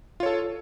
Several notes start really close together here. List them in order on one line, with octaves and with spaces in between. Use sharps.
F4 C#5 A4